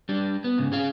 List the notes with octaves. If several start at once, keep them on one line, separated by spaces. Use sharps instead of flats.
G3 D4
B3
G#2 C#3
C#4 G#4 F5